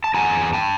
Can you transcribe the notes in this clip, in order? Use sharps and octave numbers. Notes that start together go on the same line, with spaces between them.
A5
E2 G#5 A#5
G5 A5